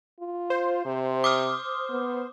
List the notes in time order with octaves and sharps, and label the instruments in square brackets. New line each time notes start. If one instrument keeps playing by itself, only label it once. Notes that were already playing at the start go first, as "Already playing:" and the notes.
[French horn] F4
[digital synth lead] C5
[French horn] C3
[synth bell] D6 D#6 F6
[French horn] B3